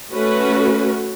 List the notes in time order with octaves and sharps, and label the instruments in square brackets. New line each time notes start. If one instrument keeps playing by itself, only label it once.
[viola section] A3 C#4 F#4 B4